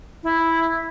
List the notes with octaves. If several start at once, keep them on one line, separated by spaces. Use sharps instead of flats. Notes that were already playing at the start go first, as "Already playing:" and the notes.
E4